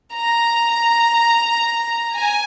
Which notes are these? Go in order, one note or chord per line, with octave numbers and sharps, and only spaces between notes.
A#5
G#5